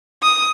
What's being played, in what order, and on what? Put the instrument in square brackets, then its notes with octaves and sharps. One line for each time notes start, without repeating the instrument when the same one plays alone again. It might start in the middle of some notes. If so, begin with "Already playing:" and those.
[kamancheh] D#6